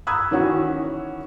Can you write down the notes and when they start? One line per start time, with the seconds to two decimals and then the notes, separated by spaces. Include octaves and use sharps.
0.07 A#5 B5 D#6 E6 F#6 G#6
0.31 D#3 E3 C#4 F#4